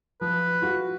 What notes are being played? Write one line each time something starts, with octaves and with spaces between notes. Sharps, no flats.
F3 B4
F4 F#4